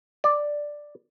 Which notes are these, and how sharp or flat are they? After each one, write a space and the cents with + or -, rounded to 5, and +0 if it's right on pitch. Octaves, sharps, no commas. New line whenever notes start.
D5 +5